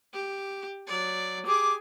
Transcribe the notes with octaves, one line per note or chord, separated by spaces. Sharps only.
G4
F#3 D5
G4 G#4 D6